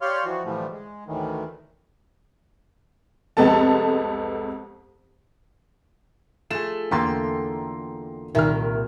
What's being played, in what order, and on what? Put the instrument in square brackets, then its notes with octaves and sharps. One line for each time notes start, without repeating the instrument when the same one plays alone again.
[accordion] G4 C#5 D5 F5 C6 F6
E3 F3 F#4
A2 D3 E3 F3 G3 A3
G#3
D2 A2 D#3 E3
[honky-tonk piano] C2 F2 G#3 B3 A4 A5
[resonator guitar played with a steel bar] A3 [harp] F4 G#4 [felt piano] E7
[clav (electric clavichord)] E2 D3 A#3 [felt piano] G5 A#5 C6 [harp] A6 B6
[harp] C2 A#2 [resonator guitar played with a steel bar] D#3 [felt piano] E5 F6